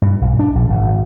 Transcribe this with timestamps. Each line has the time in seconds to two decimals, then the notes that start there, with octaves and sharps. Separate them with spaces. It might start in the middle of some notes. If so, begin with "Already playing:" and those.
0.02 G2
0.21 B1
0.39 D4
0.55 A#1
0.70 G#1